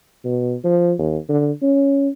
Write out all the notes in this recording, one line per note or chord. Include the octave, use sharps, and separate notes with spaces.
B2
F3
D#2
D3
C#4